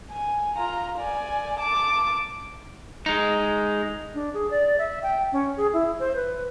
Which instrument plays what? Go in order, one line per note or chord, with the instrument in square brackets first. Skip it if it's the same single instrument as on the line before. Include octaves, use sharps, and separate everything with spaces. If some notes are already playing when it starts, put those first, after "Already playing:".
[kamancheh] G#5
F4 A#5
D5 G#5
A5 D6
[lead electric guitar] G#3 D#4
[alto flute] D4
G#4
D5
E5
G5
C#4
G#4
E4
C5
B4